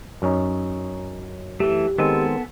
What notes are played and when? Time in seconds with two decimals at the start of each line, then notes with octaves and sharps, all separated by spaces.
0.22 F#2 C#4 D#4
1.60 E3 A3 G4
1.98 D#3 G#3 B3 C4 A4 G#5